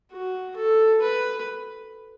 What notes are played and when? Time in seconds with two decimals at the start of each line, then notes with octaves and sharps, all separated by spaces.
0.12 F#4
0.56 A4
1.02 B4